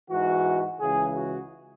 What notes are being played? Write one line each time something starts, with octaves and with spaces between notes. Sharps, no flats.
G#2 E3 F#4
C#2 C#3 E3 G#4
F#4